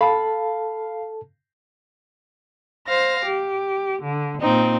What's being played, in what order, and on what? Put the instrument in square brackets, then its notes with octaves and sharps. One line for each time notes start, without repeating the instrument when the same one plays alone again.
[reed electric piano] A4 A5 [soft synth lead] F5 [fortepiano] B5
[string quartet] C5 F5 A#6
G4
D3
A#2 C4 D#4